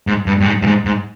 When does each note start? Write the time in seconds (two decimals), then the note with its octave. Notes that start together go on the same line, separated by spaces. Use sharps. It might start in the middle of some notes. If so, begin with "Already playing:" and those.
0.07 G#2
0.26 G2
0.40 G2
0.46 G#2
0.62 G2
0.67 G#2
0.85 G#2